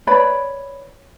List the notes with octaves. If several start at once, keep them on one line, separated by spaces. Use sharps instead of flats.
B4 C#5 D5 B5